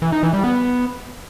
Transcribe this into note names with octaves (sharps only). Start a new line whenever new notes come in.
E3
D#4
E3
G3
B3